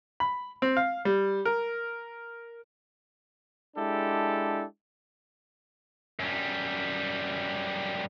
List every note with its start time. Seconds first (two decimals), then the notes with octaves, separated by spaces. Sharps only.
0.20 B5
0.62 C4
0.77 F5
1.05 G3
1.45 A#4
3.76 G#3 D4 E4 G4 A4
6.20 F#2 G3